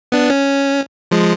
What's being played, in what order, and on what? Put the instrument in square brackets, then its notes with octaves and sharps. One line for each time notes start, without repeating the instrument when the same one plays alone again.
[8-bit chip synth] B3 D4
C#4
F3 G#3